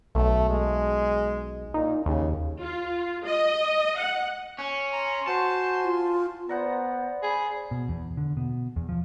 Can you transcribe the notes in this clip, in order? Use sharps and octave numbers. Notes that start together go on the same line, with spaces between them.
B1 A3
G#3
A#2 D#4
D#2 C#3
F4
D#5
F#5
C#4
G#5 A#5 C6
F#4 C5 A5
F4
B3 C5 D5 F#5 A#5
G#4 B5
B2
E2
D3
B2
E2
F3